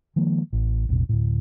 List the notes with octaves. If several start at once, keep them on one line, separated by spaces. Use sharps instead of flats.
D#3 F3 G#3 A#3
A1
A1 E2 B2
D2 A2